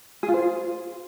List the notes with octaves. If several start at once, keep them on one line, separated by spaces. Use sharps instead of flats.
G#4
F4
C5